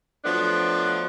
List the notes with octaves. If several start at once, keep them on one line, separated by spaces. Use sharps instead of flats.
F3 F#3 A3 B3 D4